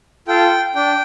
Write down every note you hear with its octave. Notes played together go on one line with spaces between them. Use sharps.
F4 A4 G5
D4 G5